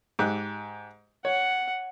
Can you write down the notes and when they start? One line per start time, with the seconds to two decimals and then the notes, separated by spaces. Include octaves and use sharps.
0.19 G#2 G4 F#6
1.25 C#5 F#5